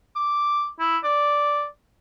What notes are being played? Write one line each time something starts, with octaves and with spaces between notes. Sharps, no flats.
D6
E4
D5